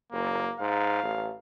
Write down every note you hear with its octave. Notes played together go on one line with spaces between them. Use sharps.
F#1 A#3
G#2 F5
A1